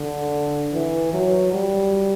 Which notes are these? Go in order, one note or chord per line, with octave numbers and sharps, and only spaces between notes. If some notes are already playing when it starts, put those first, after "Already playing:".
Already playing: D3
E3
F#3
G3